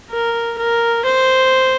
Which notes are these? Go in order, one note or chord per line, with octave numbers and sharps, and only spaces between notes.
A#4
A#4
C5